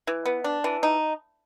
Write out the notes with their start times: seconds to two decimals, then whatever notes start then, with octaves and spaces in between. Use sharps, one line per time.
0.07 E3
0.26 B3
0.44 D4
0.64 E3
0.83 D#4